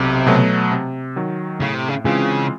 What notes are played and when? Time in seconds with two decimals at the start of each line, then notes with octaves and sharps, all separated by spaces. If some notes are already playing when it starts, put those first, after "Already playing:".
Already playing: B1 C3
0.26 B2 F#3 A3
0.71 C3
1.16 D#3 F#3
1.60 A2 C#3
1.74 C3
1.89 C#3
2.05 C#3 E3 G#3 C4 F4